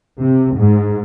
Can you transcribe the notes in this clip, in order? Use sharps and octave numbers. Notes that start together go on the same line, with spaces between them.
C3
G#2